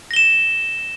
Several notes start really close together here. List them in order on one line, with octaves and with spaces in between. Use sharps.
A#6 G7 E7